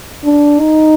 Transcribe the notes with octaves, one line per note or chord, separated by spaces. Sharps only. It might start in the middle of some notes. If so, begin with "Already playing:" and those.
D4
D#4